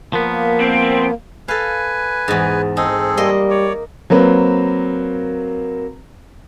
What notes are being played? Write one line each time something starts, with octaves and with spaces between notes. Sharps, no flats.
F3 A#3 B3 A#4
C4
A4 B4 F5 G#5
E2 G#2
C4 D#4 G#4 A4
G3 A#3 D#5 C6
C#5 D5
F#3 A#3 C4 B4